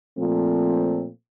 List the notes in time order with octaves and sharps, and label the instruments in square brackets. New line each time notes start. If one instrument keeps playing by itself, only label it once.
[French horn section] A#2 F3 A3 C4